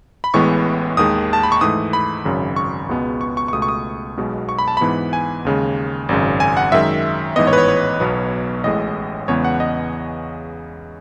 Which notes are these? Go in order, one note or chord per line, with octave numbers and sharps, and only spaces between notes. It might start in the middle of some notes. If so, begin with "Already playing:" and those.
B5
A1 A2 E3 G#3 B3 C#6
D#2 D#3 G#3 D#6
A5
B5
C#6
G#2 E3 A3 D#6
B5
G#1 F#2 C#3
C#6
C#2 B2 G#3 B3
C#6
C#6
C#6
C#2 B2 A3 D#6
C#6
D#6
B1 B2 G#3 B3
C#6
B5
A5
G#2 E3 B3 B5
G#5
D#2 C#3 G#3
G#1 F#2 C#3
G#5
F#5
F#2 D#3 G#3 E5
A1 G#2 E3 B3 D#5
C#5
B4
C#5
C#5
B1 B2 F#3 B3
A1 A2 G#3 D#5
E2 C#3 G#3 B3 C#5
F#5
D#5